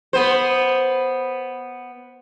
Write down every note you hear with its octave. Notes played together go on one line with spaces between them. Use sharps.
B3 C5